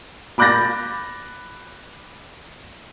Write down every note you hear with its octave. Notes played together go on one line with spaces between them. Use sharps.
B5 D6 F#6 G6 A6 A#6